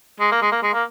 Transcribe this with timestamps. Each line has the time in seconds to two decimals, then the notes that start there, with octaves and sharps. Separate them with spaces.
0.20 G#3
0.31 A#3
0.42 G#3
0.52 A#3
0.63 G#3
0.73 A#3